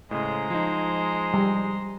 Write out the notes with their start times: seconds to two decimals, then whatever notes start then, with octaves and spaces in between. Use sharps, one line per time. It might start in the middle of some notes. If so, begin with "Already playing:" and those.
0.11 A2 C#3 G#3 C5 A#5
0.50 F3 D#4
1.34 G3